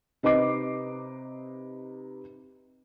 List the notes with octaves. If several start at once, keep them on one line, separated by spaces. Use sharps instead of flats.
C3 D#4 B4 D#5 D6 C7